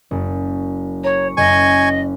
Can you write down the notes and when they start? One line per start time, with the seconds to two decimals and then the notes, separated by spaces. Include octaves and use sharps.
0.11 F#1
1.04 C#5 A#5 C#6
1.37 F#1 D#5 G#5 C#6